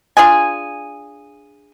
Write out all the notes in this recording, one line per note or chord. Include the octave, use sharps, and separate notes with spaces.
D4 F4 G#4 G#5